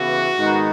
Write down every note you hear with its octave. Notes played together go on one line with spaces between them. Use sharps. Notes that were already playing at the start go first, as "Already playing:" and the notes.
Already playing: C#3 E3 B3 E4 F#4
G#2 D#3 G#3 B3 D#4